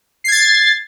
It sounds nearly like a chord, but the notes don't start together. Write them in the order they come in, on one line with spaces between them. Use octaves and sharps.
C7 G#6 A6